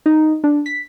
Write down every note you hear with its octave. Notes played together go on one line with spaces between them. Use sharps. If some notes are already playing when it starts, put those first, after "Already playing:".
D#4
D4
B6